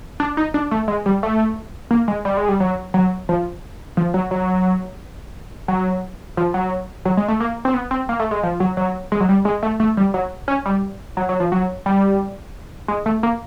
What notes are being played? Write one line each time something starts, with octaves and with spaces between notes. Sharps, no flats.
D4
D#4
D4
A3
G#3
G3
A3
A#3
G#3
G3
G#3
G3
F#3
F#3
F3
F3
F#3
F#3
F#3
F3
F#3
F#3
G#3
A3
A#3
C4
B3
C4
A#3
A3
G#3
F3
F#3
F#3
G#3
F#3
G3
G#3
A3
A3
G3
F#3
C#4
G3
F#3
F#3
F3
F#3
G3
G#3
A3
A#3